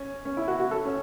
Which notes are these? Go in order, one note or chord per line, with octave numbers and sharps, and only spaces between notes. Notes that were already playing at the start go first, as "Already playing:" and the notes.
Already playing: C#4
C#4
E4
F#4
F#4
A4
C#4